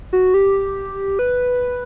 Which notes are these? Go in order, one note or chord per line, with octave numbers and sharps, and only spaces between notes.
F#4
G4
B4